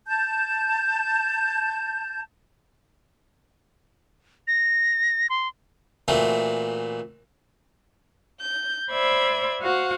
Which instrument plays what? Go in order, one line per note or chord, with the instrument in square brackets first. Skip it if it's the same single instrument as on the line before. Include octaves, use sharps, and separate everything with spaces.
[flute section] A5 G6
[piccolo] A#6
C6
[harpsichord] A#2 E3 A3 C4 F#4
[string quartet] G6
C5 D5 E5 B5 G#6
F#4 C5 F5 F#5